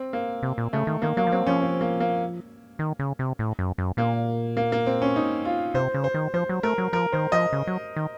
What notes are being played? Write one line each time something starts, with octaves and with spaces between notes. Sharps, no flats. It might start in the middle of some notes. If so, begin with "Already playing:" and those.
Already playing: C4
A#3
C3
A#2
C#3 A3
D#3
D#3 A#3
F#3 A#3
F3
F#3 C4
F3 C#4
C4
A#3
A#3
D#3
C#3
C3
A2
F#2
F#2
A#2 A#3
A#3
A#3
C4
C#4
D#4
F4
C3 C5
C#3
C5
D#3
F3 C5
F#3
A3 A#4
F#3
F3 A#4
D#3 C5
F3 D#5
C#3
F#3
D#3